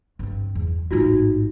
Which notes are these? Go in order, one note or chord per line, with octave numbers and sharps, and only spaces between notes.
G2 C4
E2
A1 G#2 D#4 F4 F#4